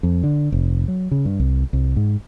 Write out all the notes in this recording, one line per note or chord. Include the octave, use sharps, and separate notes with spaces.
F2
D3
F1
F#3
C#3
G2
C2
C2
G#2